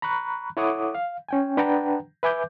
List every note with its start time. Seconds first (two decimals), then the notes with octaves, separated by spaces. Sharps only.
0.02 A#5 B5 C#6 F#6
0.57 E4 A4 C#5 F#5 D6 D#6
0.95 F5
1.29 C#4 G5 G#5
1.57 D4 B4 F#5 G5 A5 A#5
2.23 B4 E5 G#5 D6 G6